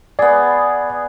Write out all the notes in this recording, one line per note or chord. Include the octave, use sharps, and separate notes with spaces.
B3 G#4 D5